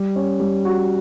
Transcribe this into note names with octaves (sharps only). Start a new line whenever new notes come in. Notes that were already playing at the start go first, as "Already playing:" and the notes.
Already playing: G3
C#4
G3
F#4